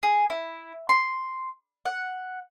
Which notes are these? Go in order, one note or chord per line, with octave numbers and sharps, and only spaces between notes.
G#4
E4
C6
F#5